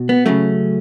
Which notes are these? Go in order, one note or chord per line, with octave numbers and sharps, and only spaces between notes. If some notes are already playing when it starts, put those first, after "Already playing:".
Already playing: B2
B3
C#3 F#3 A3 C#4